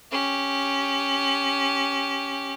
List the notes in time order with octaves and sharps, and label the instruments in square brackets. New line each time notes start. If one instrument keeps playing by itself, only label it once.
[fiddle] C#4 G4